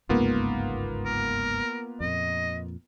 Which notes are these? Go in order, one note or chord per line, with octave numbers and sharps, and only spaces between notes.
G1 C#2 G#2 A#3 B3 F4
A#4
F2 A#2 D#5